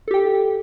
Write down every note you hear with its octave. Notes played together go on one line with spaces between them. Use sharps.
G4 A4 G5